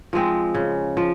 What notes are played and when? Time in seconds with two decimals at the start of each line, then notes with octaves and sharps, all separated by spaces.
0.13 F3 G#3 C4
0.55 C#3
0.97 F3